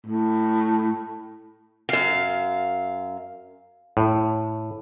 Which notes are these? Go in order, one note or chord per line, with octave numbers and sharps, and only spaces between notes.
A2
F#2 F5
A2